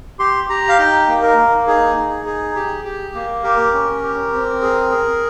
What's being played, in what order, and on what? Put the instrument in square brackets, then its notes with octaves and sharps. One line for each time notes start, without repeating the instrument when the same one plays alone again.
[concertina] G4 C6
G4 A#5
F5
D#4 G5
A#3
A#4
A#3
D#4 G#4
D#4
G#4
G4
G4
A#3
G4 A#4
C#4
G4
C4
G#4
G#4